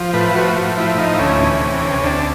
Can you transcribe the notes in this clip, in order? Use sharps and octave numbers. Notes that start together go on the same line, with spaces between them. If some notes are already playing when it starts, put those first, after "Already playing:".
Already playing: F3
A2 B4
F3 F#4
A2
F3 E4
A2 D#4
D2 C#4
E3
C3
D2
D2 D4